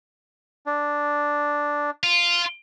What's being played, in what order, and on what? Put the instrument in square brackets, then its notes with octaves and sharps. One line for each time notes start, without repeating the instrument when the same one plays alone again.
[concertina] D4
[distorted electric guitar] F4